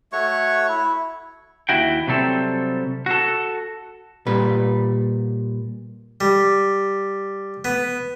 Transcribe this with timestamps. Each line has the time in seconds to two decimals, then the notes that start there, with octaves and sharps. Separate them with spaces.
0.13 A3 F#4 C#5 C#6
0.69 E4
1.69 D#2 E4 F#4 G5
2.07 C3 F#3 G3 C4 A4
3.06 F#4 A4
4.26 A#2 G3 B4
6.21 G3
7.65 B3